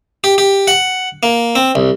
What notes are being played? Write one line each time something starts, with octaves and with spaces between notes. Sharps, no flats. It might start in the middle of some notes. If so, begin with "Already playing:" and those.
G4
G4
F#5
A#3
C4
C2